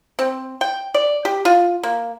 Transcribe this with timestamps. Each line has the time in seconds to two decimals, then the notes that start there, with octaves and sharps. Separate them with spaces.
0.19 C4
0.61 G5
0.94 D5
1.25 G4
1.45 F4
1.83 A#3